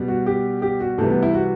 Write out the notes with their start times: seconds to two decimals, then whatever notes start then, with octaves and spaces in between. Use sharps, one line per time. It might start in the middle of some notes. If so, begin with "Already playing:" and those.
Already playing: B2 G3
0.08 F#4
0.27 G4
0.62 G4
0.81 F#4
0.98 C3 E3 G3 A3
1.10 B3
1.23 E4
1.34 F#4